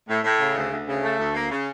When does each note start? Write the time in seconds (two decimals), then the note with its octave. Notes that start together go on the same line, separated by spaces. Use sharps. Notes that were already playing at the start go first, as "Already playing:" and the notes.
0.08 A2
0.24 A2
0.39 C#3
0.56 D2
0.71 D2
0.87 C#3
1.03 A3
1.18 D2
1.35 A#3
1.50 C#3